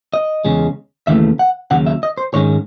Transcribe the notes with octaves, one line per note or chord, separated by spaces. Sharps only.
D#5
E2 C#3 G#3 C#4
D#2 C#3 E3 A3 E5
F#5
D#2 C#3 F#3 F#5
E5
D#5
C5
G#2 D#3 G#3 C#4 C#5